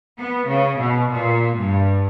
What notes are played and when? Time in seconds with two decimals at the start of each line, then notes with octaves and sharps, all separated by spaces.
0.18 B3
0.49 C#3
0.80 B2
1.11 A#2
1.56 G2